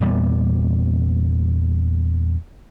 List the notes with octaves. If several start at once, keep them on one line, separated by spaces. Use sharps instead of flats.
E2 A#2 G3 B3